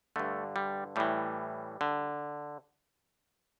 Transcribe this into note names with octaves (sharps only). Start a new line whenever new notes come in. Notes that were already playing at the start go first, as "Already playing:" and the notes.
G2 D3 A3
G3
A2 E3 G3
D3